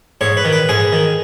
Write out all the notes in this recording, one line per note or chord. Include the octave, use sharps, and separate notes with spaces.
G#2 C#5
B4
D#3
B4
G#2 G#4
D#3